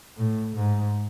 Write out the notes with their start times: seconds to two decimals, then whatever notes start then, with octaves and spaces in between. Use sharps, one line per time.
0.17 A2
0.55 G#2